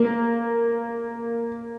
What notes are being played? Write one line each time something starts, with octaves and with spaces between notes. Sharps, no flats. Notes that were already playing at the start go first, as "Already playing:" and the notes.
Already playing: A#3